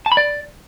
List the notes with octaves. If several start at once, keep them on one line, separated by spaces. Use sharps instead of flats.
A5
B5
D5